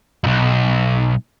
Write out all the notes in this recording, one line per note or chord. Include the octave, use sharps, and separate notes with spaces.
B1 F2